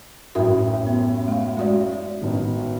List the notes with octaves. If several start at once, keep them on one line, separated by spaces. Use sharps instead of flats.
A1 F#2 A2 F#4 A#4 E5
B3
A3 F5
G#3 F#4 D5
A1 B2 D#3